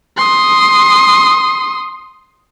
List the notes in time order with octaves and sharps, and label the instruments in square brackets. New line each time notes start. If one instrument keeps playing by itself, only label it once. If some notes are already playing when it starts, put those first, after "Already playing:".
[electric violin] C6 D#6